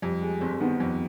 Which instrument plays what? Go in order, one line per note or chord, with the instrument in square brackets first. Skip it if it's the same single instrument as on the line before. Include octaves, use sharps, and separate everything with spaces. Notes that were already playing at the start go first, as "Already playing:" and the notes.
[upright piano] F2 [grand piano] G3
[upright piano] G#3
[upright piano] G1 [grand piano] C4
[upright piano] D#3 [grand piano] B3
[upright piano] F2